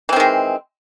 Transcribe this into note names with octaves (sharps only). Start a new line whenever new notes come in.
D#3 E3 G#3 C4